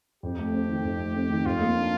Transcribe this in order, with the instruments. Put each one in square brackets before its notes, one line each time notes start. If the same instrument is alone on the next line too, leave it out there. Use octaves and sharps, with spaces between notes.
[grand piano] F2 [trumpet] G4
[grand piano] A3
C4
D#3
F2
A3
C4
D#3
[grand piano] F2 [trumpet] F4
[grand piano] A#3
D4